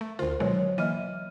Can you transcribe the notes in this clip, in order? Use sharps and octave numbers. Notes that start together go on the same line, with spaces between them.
A3
D2 D3 F4 C5
B2 D#3 F#3 G#3 C#5
E3 A#3 D#5 E5 F6 D#7